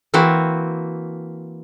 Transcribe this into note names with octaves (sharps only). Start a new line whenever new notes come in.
E3 A#3 C4 F#4